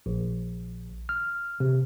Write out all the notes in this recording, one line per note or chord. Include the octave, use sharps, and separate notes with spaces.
A#1
F6
C3